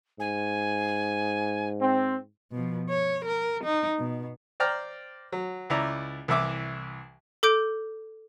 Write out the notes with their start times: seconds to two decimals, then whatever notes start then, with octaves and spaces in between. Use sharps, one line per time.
0.19 G#2 G#5
1.80 C4
2.52 B2 F3
2.89 C#5
3.25 A#4
3.64 D#4
3.99 B2
4.60 C5 D5 G5 A#5 F6
5.32 F#3
5.70 C#2 E4 D5 A#5
6.28 C2 E3 E5 D6
7.43 A4 D6 G6 D7